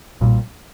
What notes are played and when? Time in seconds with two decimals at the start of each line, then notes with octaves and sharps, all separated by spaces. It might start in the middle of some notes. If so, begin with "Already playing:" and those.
0.21 B1 A#2 G3